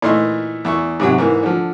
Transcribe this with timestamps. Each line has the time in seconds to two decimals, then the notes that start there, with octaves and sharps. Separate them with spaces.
0.02 A#2 E3 A3 D#4 C6
0.65 E2 E4 C#6
1.00 G#2 C3 F#3
1.18 G#2 E3 A#3
1.43 D3 F3